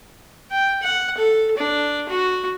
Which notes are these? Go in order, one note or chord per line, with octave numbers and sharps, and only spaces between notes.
G5
F#5
A4
D4
F#4